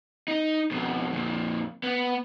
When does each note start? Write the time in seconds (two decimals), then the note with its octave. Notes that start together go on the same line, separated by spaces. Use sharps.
0.28 D#4
0.71 F2 B2
1.12 F2 A#2
1.84 B3